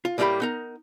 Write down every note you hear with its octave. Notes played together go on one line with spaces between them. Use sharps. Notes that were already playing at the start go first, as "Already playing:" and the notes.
F4
A2 G3 A3 A#3 G4 B5
B3 D#4 A#4